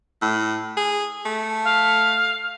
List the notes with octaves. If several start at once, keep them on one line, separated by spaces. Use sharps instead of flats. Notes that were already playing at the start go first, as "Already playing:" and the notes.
A2
G#4
A3
F5